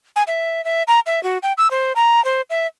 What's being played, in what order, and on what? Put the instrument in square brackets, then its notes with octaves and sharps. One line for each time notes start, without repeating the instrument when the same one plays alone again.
[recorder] G#5
E5
E5
A#5
E5
F#4
G5
E6
C5
A#5
C5
E5